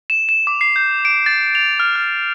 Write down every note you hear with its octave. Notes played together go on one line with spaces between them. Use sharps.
E7
E7
D6
C7
G6
D7
A6
F7
F6
F6